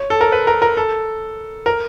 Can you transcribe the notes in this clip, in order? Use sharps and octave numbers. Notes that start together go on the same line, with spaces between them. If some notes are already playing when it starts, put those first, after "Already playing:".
Already playing: C#5
A4
A#4
B4
A#4
A#4
A4
A#4